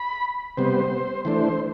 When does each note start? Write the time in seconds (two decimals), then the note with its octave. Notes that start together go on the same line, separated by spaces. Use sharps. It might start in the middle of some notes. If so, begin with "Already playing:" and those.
Already playing: B5
0.57 C3 G3 B3 C5
1.25 E3 A3 D4 C5